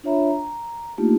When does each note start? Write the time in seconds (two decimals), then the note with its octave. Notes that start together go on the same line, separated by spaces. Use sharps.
0.04 D4 F4 C#5 E5 A#5 B5
0.29 A#5
0.98 A3 A#3 D4 D#4 F4 G4